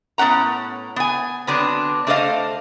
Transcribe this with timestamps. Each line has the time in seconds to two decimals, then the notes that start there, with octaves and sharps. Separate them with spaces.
0.18 A2 B3 C#4 F#5 A#5
0.96 B3 G#5
1.47 D3 F#3 B3 C4 D4
2.07 A3 D4 A4 C5 D#5 F5